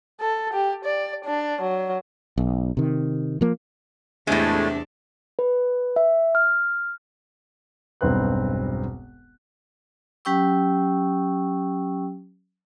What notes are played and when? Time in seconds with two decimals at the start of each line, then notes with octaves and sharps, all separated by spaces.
0.20 A4
0.53 G4
0.85 D5
1.25 D4
1.62 F#3
2.38 B1
2.77 C3 D#3
3.41 F3 A#3
4.27 E2 A2 C3 G#3 A3 D4
5.39 B4
5.96 E5
6.35 F6
8.01 E1 B1 G2 C4 B4 F#6
10.25 F#3 C#4 G4 G5 C#6 E6